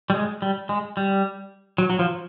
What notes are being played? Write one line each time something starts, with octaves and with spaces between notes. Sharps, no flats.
G3
G#3
G3
G#3
G3
F#3
F#3
F3